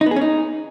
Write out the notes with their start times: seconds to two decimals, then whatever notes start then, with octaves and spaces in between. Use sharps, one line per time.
0.01 D#4
0.06 B3
0.11 G#4
0.16 C#4
0.21 D#4